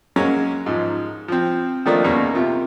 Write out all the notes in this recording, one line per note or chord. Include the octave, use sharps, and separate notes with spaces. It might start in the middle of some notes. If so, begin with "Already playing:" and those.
F#3 G#3 A#3 C#4
G#2 F3
F3 C4
D#3 F3 A3 A#3 D4 D#4
D#2 B2 G#3 A#3 C#4
C3 F4